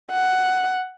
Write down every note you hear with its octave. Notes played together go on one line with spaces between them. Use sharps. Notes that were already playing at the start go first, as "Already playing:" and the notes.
F#5